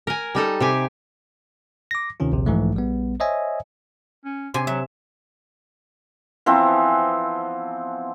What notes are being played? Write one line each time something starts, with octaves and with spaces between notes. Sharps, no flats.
A#4 G#5
G3 D#4 A4
C3 G4 G#5
D6 A#6
D2 C3 D#3 C#4 F4
A#1 D#2 C3
B1 G#2 E3 F3 A3
A#1 G3 B3
C5 C#5 D#5 E5 G#5
C#4
C3 G#5 C6
F#3 E5
E3 F3 B3 C4